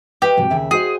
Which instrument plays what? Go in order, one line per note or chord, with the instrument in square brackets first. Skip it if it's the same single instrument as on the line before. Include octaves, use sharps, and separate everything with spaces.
[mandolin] G4 [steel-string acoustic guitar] B4 D#5 E5
[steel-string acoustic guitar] G#2 C3 F#3
D#2 C#3 E5
[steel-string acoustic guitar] F#4 C5 D#5 [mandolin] G#4